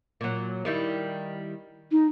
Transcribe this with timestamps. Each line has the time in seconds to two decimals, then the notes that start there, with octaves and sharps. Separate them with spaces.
0.21 A#2 F#3
0.65 D#3 G3 E4
1.91 D#4